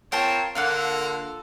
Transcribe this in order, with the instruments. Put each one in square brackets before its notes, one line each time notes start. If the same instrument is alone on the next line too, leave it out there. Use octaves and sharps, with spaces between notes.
[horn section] C4 F4 C#5 [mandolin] A#4 G5 A5
[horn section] D3 A#3 [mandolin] F4 A4 F#5